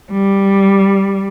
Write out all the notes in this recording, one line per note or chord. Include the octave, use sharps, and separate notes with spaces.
G3